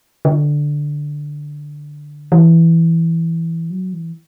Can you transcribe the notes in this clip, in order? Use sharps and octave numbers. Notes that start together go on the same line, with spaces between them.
D3
E3
F#3
E3